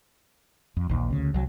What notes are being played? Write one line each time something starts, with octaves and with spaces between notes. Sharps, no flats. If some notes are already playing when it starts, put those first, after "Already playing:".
F2
A#1 D#2
D2 C#3
C2 F#3